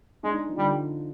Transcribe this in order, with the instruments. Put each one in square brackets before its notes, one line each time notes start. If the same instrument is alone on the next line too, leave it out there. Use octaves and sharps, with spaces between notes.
[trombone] G#3 [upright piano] D4
[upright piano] D#4
F3
[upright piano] D3 [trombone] G3